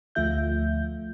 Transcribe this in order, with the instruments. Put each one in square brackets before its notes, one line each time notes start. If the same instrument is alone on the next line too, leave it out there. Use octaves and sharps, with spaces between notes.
[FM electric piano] D2 F3 A3 F4 E5 G6